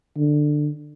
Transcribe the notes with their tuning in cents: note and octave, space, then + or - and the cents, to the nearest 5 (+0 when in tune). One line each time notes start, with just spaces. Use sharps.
D3 +15